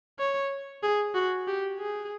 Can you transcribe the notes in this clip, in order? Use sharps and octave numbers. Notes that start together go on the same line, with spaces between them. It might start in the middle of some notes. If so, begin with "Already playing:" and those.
C#5
G#4
F#4
G4
G#4